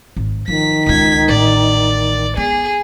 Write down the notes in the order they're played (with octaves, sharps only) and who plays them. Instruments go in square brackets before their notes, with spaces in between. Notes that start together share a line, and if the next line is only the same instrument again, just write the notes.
[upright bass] G#1
[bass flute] D#3 [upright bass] F3 [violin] B6
[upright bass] C#2 C#3 [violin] G#6 B6
[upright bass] A1 [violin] D5
[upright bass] B3 [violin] G#4